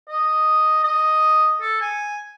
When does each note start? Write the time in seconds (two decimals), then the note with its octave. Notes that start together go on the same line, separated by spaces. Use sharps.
0.09 D#5
0.83 D#5
1.61 A4
1.81 G#5